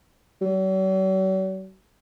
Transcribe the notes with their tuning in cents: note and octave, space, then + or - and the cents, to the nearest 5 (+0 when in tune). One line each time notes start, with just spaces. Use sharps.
F#3 +45